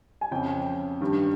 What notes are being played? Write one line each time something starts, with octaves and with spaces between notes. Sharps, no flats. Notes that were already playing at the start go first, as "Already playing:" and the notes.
G#5
F2 C#3 G5
G2 D#3